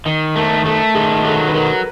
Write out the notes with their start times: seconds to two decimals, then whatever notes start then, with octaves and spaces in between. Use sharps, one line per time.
0.05 D#3 D#5
0.36 A3 A#4
0.65 A3 A4
0.94 D#3 G#4
1.24 F#3 A4
1.48 B4
1.54 F#3 A#4